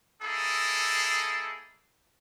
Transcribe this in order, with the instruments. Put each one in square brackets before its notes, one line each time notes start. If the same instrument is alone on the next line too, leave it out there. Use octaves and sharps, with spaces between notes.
[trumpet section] A#3 D#4 E4 G#4 A4